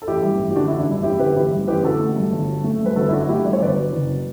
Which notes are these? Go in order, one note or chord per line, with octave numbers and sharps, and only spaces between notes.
A4
A1 E4 G4
G2
A1
G4
D3 D4 F#4
E4
A1
D4
G2 E4
A1 E4 G4
D3 G4 B4
A1 E4 G4
G2
A1 G4 B4
D3 F#4 A4
A3
G2
G1
F#3
A3
G2 B4
G1 F#4 A4
E4
F#3 D4 F#4
A3 E4 G4
G2 D5
C#5
G1 B4 D5
F#3
F#1